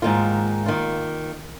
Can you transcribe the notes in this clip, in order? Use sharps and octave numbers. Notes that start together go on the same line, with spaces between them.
G#2 D#3 A#3 F4
D#3 A#3 F4